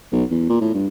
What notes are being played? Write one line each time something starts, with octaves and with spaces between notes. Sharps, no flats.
B1
E2
A#2
A2
G2